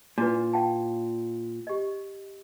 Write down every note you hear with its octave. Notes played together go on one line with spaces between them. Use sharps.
A#2 D4 E4 B4
F5 G5 A5
G4 D#5